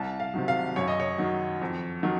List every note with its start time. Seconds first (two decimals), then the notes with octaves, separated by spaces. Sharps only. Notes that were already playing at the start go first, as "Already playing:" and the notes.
Already playing: C2 A5
0.20 F5
0.34 C3 D#3 F#3
0.48 F5
0.76 F#2 C#5
0.88 D#5
1.00 C#5
1.18 D#3 F#3
1.61 F2
2.03 D#3 F#3